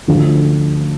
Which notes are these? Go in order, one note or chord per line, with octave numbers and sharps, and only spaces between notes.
D2 D3 F3 A3